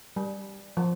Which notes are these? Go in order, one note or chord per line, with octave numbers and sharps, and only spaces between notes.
G3
F3